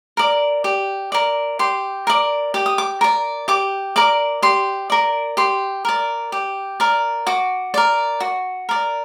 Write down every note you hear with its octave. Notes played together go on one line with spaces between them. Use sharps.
A#4 D5
G4
A#4 D5
G4 C6
A#4 D5
G4 D6
D#6
D6
A#4 D5
G4 D6
A#4 D5 D6
G4 C6
A#4 D5
G4 C6
A#4 D5
G4
A#4 D5
F#4 D6
A#4 D5
F#4
A#4 D5